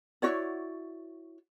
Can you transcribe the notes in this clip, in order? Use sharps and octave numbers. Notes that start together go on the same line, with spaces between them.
E4 F#4 C#5 D5